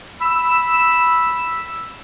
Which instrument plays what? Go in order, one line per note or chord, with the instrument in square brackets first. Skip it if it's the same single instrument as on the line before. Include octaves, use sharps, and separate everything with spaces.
[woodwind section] B5 E6